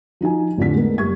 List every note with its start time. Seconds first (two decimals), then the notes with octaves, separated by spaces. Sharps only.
0.21 F3 D#4 F#4 G#5
0.58 A1 F2 D3 D4 B6
0.75 G#3 A3 B3 A#4
0.98 F#1 G3 C#6 G#6